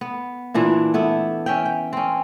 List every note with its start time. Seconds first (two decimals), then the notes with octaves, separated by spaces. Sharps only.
0.01 B3
0.54 A#2 E3 D4 E4
0.94 A3 B3 E4
1.46 C#4 E5 G5
1.65 G5
1.93 C4 C#4